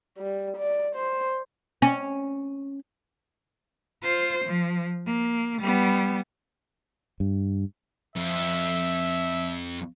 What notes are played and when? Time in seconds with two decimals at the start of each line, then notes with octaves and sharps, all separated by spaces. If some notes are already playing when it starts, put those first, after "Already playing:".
0.18 G3
0.57 D5
0.95 C5
1.82 C#4
4.03 F4 C5
4.45 F3
5.07 A#3
5.61 G3 B3
7.20 G2
8.16 F2 E5